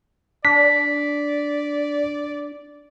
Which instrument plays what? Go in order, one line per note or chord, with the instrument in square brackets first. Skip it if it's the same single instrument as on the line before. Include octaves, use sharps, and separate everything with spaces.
[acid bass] D4 [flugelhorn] D5 [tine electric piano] B6